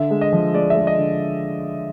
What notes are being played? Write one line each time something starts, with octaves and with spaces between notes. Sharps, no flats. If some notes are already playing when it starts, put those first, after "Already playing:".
Already playing: D3 E5
G#3
D#5
F3
G#3 D5
E5
G#3
D#5
D3